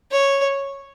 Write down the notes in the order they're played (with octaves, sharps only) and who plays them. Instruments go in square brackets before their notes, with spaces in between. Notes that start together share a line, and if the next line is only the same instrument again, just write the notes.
[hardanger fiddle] C#5